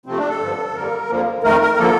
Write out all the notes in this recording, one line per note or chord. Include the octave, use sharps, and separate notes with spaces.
C3 F3 A3 C4
D4
A4
G2 D3 F3
F2 D3 G3 A#3 A#4
F2 D3 F3 A#3
F2 D#3 A3 A#4
A#4
D3 F3 A#3 A4